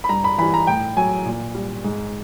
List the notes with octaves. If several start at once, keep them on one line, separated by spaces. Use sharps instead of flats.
B5
G2 A#5
B5
E3 G3 B5
A#5
A2 G5
F#3 G#5
A#2
G3
G#2